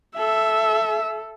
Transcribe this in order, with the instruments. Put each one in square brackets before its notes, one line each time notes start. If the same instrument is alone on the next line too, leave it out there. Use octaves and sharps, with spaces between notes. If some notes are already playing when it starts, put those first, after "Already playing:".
[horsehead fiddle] A4 [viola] E5